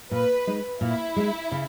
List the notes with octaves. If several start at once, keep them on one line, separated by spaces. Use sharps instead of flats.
A#2 B4
G#3 D#4
A#2 E4
G#3 D#4
C#3